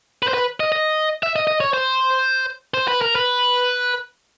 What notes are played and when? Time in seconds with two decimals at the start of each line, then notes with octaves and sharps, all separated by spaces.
0.23 B4
0.28 C5
0.34 B4
0.60 D#5
0.72 D#5
1.23 E5
1.36 D#5
1.47 D#5
1.61 C#5
1.73 C5
2.74 C5
2.88 B4
3.02 A#4
3.15 B4